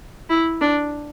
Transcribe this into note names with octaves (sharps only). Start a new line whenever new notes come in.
E4
D4